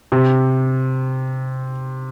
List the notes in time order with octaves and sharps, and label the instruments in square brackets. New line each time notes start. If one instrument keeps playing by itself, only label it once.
[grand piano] C3